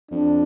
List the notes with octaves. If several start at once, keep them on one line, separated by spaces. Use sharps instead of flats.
F2 D4